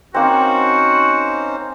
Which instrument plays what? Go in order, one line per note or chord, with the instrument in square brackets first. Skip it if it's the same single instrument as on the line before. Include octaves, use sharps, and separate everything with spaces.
[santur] A#3 C4 [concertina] C#4 D#4 C5 [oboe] F#4